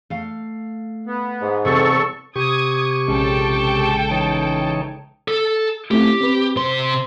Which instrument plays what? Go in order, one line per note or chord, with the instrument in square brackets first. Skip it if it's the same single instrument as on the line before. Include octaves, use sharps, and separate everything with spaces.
[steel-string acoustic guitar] A3 F5
[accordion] B3
[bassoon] G#2
[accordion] E2 A4 C#6 [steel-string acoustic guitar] C3 G3 G4
[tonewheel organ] C3 G4 C#6 [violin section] D#6 G#6
[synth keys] A#1 C#3 G#3 [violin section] A4 G5 A5
[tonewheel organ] E3 D#4 C#5
[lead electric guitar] A4
[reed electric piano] A3 C4 E4 [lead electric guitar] G4
[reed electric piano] C4 B4
[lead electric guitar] C3 C6 [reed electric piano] C5